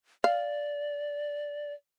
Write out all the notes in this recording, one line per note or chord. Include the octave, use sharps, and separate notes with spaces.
D5 F5